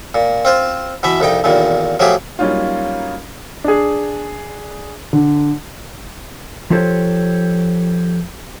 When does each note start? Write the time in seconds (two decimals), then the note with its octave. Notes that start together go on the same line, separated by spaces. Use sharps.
0.15 A#2
0.45 C4 F4 C5
1.03 B2 E3 E5
1.20 C2 F2 D#4 G5
1.44 B1 E2 A#2 D#3
2.00 F3 F#3 A3 G4 G#4
2.39 F#3 G3 A#3 C#4 D#4 F4
3.64 D4 G#4
5.13 D3
6.70 F3 F4 G4 A4 C5 C#5